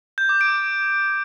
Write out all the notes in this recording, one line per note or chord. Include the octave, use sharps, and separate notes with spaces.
G6
D6
D7